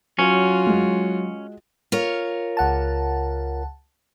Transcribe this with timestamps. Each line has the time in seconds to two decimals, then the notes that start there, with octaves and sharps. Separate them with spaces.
0.19 F#3 C#4 F4 F#4
0.67 G#3
1.92 F4 A#4 C#5
2.57 C#2 F#5 A5